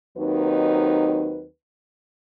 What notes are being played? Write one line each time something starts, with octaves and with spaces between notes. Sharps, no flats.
D#2 F#3 C4 D#4 B4